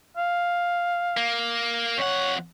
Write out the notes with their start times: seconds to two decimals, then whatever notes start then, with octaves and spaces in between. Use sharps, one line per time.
0.17 F5
1.17 A#3
1.98 F2 C#5 F#5